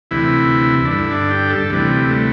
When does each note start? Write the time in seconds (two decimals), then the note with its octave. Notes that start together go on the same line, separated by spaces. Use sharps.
0.11 D2 C3 E3 E4
0.85 D4
0.91 G2 D3 E4
1.11 D4
1.30 G4
1.50 A4
1.70 D2 C3 E3 G3
2.10 A3